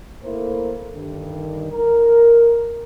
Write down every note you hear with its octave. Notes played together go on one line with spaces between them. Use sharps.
A3 A#3 E4 A4 A#4 C5
G2 D3 D#3
A#4